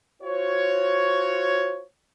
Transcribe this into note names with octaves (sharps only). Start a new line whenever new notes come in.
F4 F#4 C5 C#5